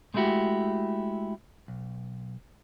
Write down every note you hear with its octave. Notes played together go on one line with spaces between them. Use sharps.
G#3 A3 D4 E4 F#4 G4
B1